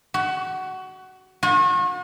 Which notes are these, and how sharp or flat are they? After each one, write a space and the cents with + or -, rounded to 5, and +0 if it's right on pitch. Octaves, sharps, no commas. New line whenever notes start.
F#4 +20
F#4 -40